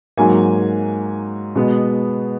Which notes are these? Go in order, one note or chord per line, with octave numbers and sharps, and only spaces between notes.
G#2 F#3 A#3 G#5
B2 G#3 B3